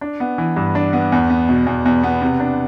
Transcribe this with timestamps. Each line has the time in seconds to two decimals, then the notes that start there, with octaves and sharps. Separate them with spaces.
0.01 D4
0.20 B3
0.38 E3
0.56 G2
0.75 D4
0.93 B3
1.12 E2
1.30 B3
1.49 B2
1.66 E2
1.85 E2
2.03 B3
2.21 C3
2.40 D4